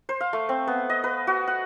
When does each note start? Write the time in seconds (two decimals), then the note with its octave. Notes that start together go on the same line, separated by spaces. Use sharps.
0.09 C5
0.21 F5
0.33 A3
0.49 C4
0.67 B3
0.90 D#5
1.04 B4
1.27 F#4
1.47 F#5